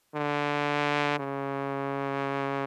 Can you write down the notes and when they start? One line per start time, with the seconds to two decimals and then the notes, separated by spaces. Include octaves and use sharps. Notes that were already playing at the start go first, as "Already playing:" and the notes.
0.15 D3
1.19 C#3